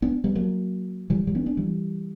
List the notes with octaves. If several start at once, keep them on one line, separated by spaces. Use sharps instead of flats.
B3 D4
G3 B3
F#3 A#3
E3 G3
E3 G3
B3 D4
B3 D4
E3 G3